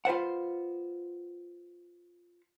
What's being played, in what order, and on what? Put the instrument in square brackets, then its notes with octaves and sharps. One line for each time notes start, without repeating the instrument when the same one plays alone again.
[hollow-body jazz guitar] F4 B4 C5 F#5